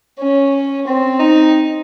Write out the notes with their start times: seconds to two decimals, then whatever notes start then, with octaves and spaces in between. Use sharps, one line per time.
0.20 C#4
0.87 C4
1.20 D#4